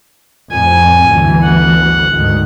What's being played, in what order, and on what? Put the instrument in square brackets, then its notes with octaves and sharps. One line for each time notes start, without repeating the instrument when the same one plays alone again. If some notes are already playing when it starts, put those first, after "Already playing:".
[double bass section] F2 A2 [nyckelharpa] G#5
[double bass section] G1 D2 E3
[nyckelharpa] F#5
[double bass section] D2 G#2 D#3